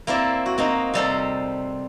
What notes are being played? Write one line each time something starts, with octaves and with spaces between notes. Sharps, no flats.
A#3 C4 E4 A#4 D5
F#4
A#3 C4 D#4
C3 G3 A4 C5